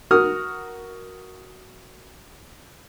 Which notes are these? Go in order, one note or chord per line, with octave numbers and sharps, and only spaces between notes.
F#4 A#4 D#6 F6